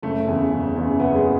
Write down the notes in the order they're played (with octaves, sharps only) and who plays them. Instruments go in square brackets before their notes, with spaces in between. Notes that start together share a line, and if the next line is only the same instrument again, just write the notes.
[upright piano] F#1 A3
E2 C#3
F#1
E2 C#3
F#1 B3
G#3
C#3